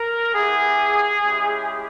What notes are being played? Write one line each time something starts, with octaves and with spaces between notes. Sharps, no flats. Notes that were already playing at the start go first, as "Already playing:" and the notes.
Already playing: A#4
B3 E4 G4 G#4
G#3 C#4 E4 G4